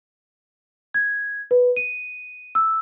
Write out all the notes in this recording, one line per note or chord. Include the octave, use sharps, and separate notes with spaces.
G#6
B4
D#7
E6